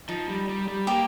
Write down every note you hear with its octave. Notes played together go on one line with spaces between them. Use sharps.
F3 D#4
G3
G3
G3
A#3 G4